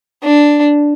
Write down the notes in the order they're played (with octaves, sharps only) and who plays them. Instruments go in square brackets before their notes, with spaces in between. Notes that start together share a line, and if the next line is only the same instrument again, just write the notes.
[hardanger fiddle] D4